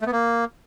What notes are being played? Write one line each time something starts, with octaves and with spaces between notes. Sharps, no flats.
A3
B3
A#3